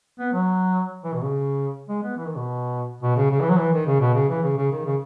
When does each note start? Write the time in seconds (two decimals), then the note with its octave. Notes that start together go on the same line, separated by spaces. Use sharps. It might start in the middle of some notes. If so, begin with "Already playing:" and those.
0.19 B3
0.33 F#3
1.04 E3
1.14 B2
1.23 C#3
1.89 G#3
2.03 B3
2.17 E3
2.26 D#3
2.36 B2
3.02 B2
3.16 C#3
3.31 C#3
3.40 E3
3.50 F#3
3.59 E3
3.73 D#3
3.87 C#3
4.00 B2
4.15 C#3
4.29 E3
4.43 C#3
4.57 C#3
4.72 D#3
4.85 C#3